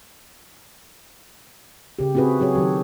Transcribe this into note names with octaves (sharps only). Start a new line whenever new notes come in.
C#3 G4
C4 E4 F#4 G#4 B4
F#3 F#4 G#4 C#5
D#3 F#3 G4 A4